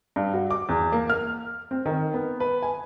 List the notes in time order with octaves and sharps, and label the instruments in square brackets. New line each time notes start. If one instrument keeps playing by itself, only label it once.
[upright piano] G2
F#4
D6
E2
A#3
F6
C4
D#3
B3
B4
G#5